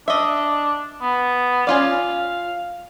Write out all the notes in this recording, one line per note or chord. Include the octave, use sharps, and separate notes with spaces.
D4 D#5 E5
B3
C#4 F4 D5 F5